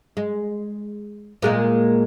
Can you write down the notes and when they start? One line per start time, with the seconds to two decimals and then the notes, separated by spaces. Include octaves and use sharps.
0.17 G#3
1.42 A#2 G#3 A#3